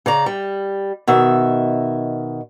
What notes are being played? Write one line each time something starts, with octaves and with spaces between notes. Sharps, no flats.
C#3 D5 A#5
G3
B2 D#3 E5